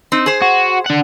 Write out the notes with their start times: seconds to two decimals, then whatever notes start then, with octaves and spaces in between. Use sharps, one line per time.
0.12 C4 D#4
0.26 G#4 C5
0.42 F#4
0.86 D4 F#5